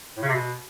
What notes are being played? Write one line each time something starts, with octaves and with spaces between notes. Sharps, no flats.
A2
C#3
C3
B2